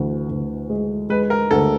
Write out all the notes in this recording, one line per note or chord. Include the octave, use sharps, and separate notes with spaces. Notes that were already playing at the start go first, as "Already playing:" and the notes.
Already playing: D2 E3
D2
G#3
G#3 B4
A#4
D2 A4